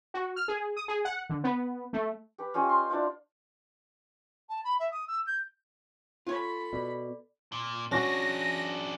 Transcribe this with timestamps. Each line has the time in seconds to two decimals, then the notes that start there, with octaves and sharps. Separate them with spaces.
0.14 F#4
0.36 F6
0.48 G#4
0.76 D#6
0.88 G#4
1.05 F#5
1.29 D3
1.44 B3
1.93 A3
2.38 G4 B4
2.54 C#4 F4 G4 D#5
2.69 C6
2.90 D4 E4 F4 C5
4.49 A5
4.64 B5
4.80 E5
4.92 D#6
5.08 E6
5.27 G6
6.27 F4 A4 C#5 B5
6.73 B2 D5
7.52 A#2
7.91 C#4 D4 F#4 G#4 A#6